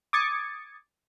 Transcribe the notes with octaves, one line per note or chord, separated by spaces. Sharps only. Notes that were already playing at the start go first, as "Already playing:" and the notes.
D6 D#6 G#6 A6 C#7